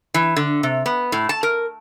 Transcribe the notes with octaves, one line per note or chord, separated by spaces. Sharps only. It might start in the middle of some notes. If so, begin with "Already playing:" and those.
E3
D3
C3
B3
A2
A5
A#4